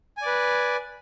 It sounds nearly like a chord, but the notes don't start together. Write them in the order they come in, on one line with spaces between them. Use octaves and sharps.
G#5 D5 B4